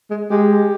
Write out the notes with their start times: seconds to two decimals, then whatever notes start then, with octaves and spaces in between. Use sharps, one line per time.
0.10 G#3
0.30 G#3 G4